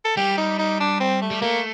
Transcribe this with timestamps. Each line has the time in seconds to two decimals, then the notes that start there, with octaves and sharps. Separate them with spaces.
0.04 A4
0.17 G3 G4
0.37 D#4
0.59 D#4
0.80 D4
1.00 C4
1.22 A3
1.31 G3
1.42 A3 A#3